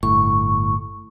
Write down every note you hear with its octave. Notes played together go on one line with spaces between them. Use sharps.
G1 A2 C#6